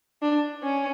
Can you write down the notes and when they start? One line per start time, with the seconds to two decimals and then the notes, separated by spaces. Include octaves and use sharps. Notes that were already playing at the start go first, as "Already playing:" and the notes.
0.22 D4
0.63 C#4